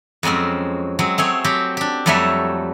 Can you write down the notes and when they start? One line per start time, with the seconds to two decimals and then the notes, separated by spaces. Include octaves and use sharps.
0.23 F2 F#3 G#3 C4 C#4
0.99 F#3 G#3 C4
1.18 A3 C4 G#4 C#5
1.44 F#3 C4 G4
1.77 D4 G4
2.06 F2 F#3 G3 A3 C#5 E5